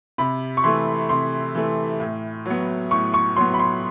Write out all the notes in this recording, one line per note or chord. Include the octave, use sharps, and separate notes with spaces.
C3 B5
C#6
E3 A3 C6
C3 C6
E3 A3
A2
F#3 B3
A2 C#6
C#6
F#3 B3 C6
B5
C6